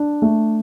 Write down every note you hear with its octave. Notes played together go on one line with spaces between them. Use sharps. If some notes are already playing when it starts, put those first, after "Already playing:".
Already playing: D4
A3